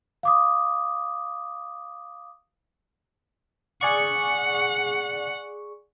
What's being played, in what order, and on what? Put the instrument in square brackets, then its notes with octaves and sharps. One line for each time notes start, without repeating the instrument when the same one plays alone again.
[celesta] F5 D6 D#6
[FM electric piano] G#4 D5 C#6 [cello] F#5